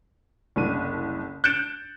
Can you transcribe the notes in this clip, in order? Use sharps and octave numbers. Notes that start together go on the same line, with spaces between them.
F#1 C2 D4 D#7
F#6 G6 A6 C#7 D7 E7